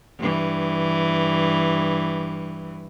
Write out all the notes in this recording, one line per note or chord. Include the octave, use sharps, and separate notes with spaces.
G2 E3